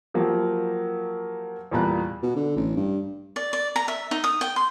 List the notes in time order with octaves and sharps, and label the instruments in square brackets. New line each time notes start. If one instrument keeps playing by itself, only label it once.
[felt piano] F3 F#3 A#3 G4
E2 A#2 G3 A5 A#5 F#6
[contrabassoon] B2
D3
A1
G2
[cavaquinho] D5
D5
A#5
E5
D#4
D#6
G5
C6